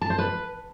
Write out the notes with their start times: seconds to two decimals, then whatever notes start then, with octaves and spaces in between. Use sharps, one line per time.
0.01 A5
0.10 C5
0.18 B4